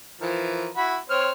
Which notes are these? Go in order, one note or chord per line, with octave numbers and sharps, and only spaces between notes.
E3 F3 A#4
E4 F#4 B5
C4 C#5 F6